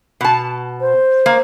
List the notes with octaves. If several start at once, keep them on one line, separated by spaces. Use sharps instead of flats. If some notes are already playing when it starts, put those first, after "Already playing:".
B2 A5
C5
A#3